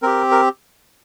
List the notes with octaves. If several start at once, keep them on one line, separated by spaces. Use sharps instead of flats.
C4 G4 A#4
A#4